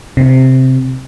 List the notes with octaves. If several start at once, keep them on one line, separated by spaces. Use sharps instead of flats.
C3